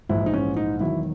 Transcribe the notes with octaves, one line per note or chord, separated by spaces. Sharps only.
A#1 G#2 E3 E4
D#4
C#4
D#4
E1 E2 D#3 F#3 E4